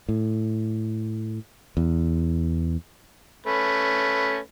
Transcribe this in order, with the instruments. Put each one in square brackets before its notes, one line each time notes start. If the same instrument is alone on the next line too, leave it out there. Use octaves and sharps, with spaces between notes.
[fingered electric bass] A2
E2
[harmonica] A3 C#4 B4